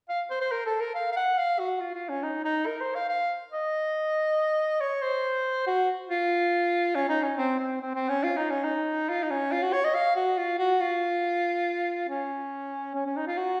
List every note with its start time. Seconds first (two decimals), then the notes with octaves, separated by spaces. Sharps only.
0.09 F5
0.30 C5
0.41 C5
0.52 A#4
0.66 A4
0.80 A#4
0.95 F5
1.12 F5
1.16 F#5
1.38 F5
1.59 F#4
1.80 F4
1.94 F4
2.09 C#4
2.23 D#4
2.45 D#4
2.66 A#4
2.81 C5
2.95 F5
3.09 F5
3.52 D#5
4.81 C#5
5.02 C5
5.67 F#4
6.09 F4
6.95 C#4
7.09 D#4
7.23 C#4
7.38 C4
7.59 C4
7.81 C4
7.95 C4
8.09 C#4
8.24 F4
8.37 D#4
8.50 C#4
8.64 D#4
9.09 F4
9.23 D#4
9.31 C#4
9.52 F4
9.62 F#4
9.73 C#5
9.84 D#5
9.95 F5
10.16 F#4
10.38 F4
10.59 F#4
10.81 F4
12.09 C#4
12.95 C#4
13.06 C#4
13.16 D#4
13.27 F4
13.38 F#4